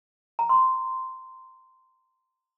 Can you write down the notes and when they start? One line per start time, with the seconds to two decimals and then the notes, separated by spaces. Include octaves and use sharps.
0.39 A#5
0.49 C6